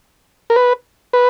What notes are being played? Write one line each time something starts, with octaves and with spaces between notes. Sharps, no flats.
A#4
B4
B4